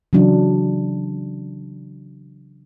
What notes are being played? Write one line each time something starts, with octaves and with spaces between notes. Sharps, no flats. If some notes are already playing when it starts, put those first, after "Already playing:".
C#3 E3 F#3 D4